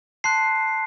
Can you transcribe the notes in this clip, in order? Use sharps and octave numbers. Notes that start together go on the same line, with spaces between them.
A5 C6 F#6 C7